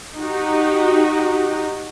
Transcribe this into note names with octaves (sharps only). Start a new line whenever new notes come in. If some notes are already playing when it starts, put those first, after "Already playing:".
D#4 F#4 G4